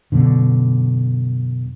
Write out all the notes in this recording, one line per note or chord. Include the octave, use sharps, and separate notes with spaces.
F#2 B2 D3